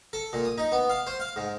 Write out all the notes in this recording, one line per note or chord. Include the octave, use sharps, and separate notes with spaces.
A4
A#2
D#6
D#4
B3
F5
C5
F5
G#2